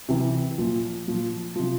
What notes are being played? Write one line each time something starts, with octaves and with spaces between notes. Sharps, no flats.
C3 E3
A#2 F3
A#2 F3
C3 F3